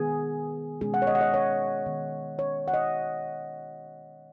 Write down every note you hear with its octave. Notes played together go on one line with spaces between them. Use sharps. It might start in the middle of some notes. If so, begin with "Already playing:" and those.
Already playing: D#3 B3 G#4
B2 G#3 C#4 G#4
F#5
C#5
D#5
F#5
D#5
C#5
D#3 B3
C#5
F#5
D#5